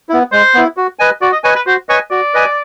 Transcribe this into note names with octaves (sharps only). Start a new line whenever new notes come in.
B3 E4
G#3 C5
B3 E4
F#4
B4 D#5 G#5
F#4 D5
D#5
B4 C#5 D#5 G#5
B4
F#4 C5
B4 C#5 D#5 G#5
F#4 D5
B4 D#5 G#5